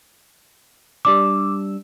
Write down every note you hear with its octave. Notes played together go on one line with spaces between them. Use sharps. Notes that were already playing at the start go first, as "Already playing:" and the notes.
G3 D4 D6 E6